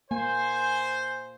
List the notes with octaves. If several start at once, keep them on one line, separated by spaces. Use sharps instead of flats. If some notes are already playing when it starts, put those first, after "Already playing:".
A#3 C5 G#5